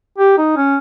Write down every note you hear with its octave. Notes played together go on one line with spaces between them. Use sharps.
G4
D#4
C#4